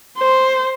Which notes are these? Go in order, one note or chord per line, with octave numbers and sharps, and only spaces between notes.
C5